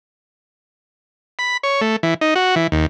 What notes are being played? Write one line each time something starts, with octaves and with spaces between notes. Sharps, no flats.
B5
C#5
A3
E3
D#4
F#4
E3
D#2